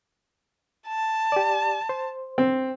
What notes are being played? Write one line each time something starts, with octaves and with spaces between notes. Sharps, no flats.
A5
G4 D5
C5
C4